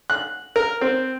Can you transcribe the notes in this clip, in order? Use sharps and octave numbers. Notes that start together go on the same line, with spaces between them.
F#6
A#4
C4